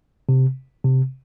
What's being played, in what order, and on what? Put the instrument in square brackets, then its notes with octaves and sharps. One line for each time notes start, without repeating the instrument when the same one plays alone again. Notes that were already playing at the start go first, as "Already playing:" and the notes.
[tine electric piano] C3
C3